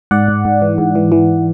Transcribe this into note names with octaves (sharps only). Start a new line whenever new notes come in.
G#2 D5 F#5
G#2
G#2
E3
G#2
E3
E3